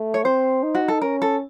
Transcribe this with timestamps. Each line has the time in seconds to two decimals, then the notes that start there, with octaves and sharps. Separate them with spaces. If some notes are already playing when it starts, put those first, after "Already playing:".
Already playing: A3
0.14 C#5
0.24 C4 C5
0.63 D#4
0.75 F#4
0.88 A4
1.01 C#4 A#4
1.22 A4